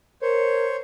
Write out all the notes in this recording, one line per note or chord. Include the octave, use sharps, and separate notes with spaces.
A#4 C5 C#5